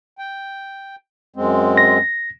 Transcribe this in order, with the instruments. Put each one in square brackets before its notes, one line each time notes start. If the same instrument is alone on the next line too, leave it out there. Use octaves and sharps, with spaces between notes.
[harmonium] G5
F#2 G#3 C4
[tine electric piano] A#6